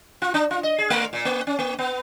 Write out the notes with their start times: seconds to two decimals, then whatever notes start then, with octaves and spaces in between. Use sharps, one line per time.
0.22 F4
0.34 D4
0.51 F4
0.63 D#5
0.78 G#4
0.90 A3
1.13 A#2
1.25 A#3
1.47 C#4
1.59 A#3
1.78 B3